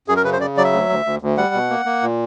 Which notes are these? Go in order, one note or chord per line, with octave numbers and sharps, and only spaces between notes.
F#2 G#4
A#4
C#3 B4
C5
C#3 D5
F#3 D5
E5
D2
D2
D2
D2
G3 F#5
B2
A#3
A#3
A#2